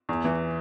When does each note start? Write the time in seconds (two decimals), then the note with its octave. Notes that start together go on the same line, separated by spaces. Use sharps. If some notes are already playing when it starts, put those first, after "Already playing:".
0.09 E2
0.24 E3